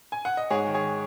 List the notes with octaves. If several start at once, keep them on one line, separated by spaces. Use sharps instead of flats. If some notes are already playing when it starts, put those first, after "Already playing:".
G#5
F#5
D#5
G#2 G#4 C#5
D#3
G#4 C#5